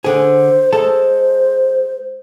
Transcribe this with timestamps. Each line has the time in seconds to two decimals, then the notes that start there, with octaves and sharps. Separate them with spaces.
0.04 D3 G#4 C5
0.73 G#3 A4 C5